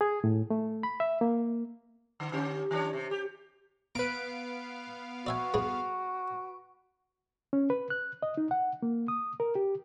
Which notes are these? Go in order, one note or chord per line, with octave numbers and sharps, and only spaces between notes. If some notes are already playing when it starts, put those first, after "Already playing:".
G#4
A2
A3
B5
E5
A#3
D3
D3 C#4 G4
D#3 D4 C#5
C3
G4
B3 B4 F5 A#5 D7
F#4 D5 E5 G#5
G2 D4 G#4
C#4
B4
F#6
D#5
D#4
F#5
A#3
D#6
A#4
G4